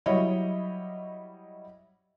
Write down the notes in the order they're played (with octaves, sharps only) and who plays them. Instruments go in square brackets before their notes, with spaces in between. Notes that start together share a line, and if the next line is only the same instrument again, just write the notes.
[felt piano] F#3 G3 E4 C#5 D#5